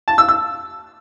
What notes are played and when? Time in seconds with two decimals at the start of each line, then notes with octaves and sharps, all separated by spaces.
0.08 A5
0.18 E6
0.28 E6